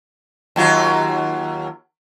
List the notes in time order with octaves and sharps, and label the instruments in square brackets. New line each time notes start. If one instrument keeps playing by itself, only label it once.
[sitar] D#2 F#3 F4